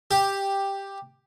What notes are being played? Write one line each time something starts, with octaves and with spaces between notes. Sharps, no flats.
G4